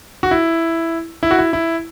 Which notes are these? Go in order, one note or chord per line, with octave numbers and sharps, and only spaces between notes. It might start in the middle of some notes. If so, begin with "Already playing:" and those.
F#4
E4
E4
F#4
E4
E4